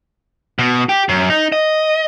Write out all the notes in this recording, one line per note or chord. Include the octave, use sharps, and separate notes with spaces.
B2
G4
F#2
D#4
D#5